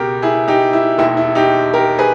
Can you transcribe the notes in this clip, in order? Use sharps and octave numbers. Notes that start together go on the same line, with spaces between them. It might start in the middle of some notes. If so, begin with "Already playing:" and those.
Already playing: C#2 B2 G4 A#4
E4 G#4
D#4 G4
E4
E1 D#2 D#3 E4
E4
D#4 G4
G4 A#4
G#4 B4